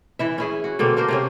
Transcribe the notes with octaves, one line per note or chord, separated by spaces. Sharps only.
E3 E4 E5
C#4 E4 G#4
F#4
B2 D3 A#3 C4
A#3 D4 A#4 C5
C3 A#3 C#4